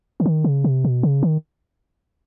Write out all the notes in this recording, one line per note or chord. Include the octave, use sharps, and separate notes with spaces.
D3
D#3
C#3
C3
B2
C#3
D#3